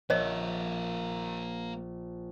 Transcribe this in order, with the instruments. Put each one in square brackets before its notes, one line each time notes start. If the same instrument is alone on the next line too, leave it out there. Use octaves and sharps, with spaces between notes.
[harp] A#1 [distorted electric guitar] A#3 E5 [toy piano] C5 C#5 D#5